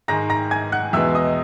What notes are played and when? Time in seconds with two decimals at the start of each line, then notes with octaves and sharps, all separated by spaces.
0.08 G#2 D#3 G#3 A#5 A#6
0.30 A#5 A#6
0.51 G#5 G#6
0.72 F#5 F#6
0.93 E2 B2 G#3 B3 E5 E6
1.15 D#5 D#6